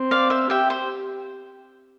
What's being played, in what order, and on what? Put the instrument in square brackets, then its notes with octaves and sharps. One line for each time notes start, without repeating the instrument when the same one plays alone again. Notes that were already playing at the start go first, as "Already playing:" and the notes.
Already playing: [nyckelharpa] C4
[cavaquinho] D5 F5
C5 E5
[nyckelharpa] G4 [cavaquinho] E5 G5
[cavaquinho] C5